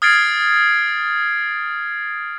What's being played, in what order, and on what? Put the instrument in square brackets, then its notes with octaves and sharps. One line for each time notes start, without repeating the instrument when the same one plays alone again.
[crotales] D#6 F6 G#6 A6 C7 D7